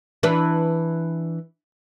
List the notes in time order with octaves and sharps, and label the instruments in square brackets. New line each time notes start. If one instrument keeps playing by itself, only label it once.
[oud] E3 D4 B4